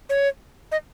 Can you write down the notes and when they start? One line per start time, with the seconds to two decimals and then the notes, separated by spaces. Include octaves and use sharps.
0.10 C#5
0.72 D#5